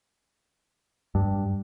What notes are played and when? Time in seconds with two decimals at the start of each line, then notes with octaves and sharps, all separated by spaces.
1.15 G2